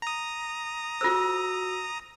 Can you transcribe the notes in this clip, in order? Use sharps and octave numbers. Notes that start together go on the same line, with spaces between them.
A#5 D#6
F4 F#4 A4 C5 E6